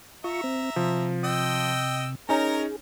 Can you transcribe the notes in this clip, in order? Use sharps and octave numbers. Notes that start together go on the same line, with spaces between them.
F4 E5 A#5 C#6
C4
C3 F3
D#5 G5 E6
C#4 D#4 G#4 A#4 C#5 A#5